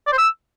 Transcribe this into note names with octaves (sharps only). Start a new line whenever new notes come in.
D5
C5
E6